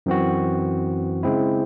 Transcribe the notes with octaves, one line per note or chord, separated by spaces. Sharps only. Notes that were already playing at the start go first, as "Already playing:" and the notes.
F#2 E3 C4 F#4
C#3 G#3 C4 E4